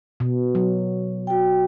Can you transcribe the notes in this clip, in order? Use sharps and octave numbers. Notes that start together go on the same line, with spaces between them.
B2
F#3
F#4 G5